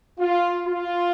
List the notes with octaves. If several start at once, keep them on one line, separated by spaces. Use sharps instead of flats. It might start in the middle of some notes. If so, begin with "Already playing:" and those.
F4
F4